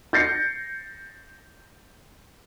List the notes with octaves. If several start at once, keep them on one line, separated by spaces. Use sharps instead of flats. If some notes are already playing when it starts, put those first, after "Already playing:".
G6 A6 A#6 C7 C#7